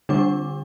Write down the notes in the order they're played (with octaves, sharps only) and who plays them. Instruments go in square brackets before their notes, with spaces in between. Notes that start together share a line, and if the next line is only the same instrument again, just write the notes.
[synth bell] D3 G3 D4 D6